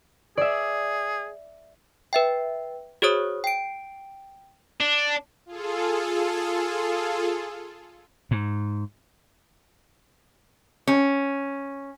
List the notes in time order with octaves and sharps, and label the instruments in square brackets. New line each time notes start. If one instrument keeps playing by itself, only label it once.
[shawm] G#4 [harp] D5 E5
[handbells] B4 E5 G5
F#4 G#4 C5 C#5 D#6
G5 D7
[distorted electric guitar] D4
[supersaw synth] F4 G#4 A4
[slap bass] G#2
[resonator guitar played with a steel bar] C#4